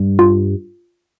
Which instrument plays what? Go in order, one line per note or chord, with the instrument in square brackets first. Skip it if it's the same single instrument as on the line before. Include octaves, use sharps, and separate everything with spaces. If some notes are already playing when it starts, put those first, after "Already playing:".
Already playing: [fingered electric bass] G2 G3
[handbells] F4